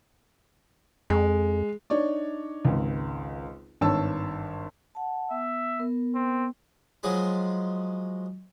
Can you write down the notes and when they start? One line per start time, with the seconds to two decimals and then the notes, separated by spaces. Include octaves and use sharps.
1.10 F2 G#3
1.90 D4 D#4 C#5 D5
2.65 G#1 C#2
3.81 G#1 G2 C#5 A5 E6
4.95 F#5 A5
5.31 B3 E5
5.79 B3 A#4
6.15 C4
7.03 F3 F#3 G#3 G#4 B5